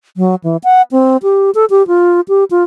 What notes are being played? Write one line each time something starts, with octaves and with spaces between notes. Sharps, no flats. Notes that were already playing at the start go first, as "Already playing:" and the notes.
F#3
E3
F#5
C4
G4
A4
G4
F4
G4
F4